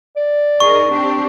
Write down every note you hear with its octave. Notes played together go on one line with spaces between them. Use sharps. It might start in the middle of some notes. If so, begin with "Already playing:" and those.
D5
D#4 G#4 A#4 C#6
C4 D4 G4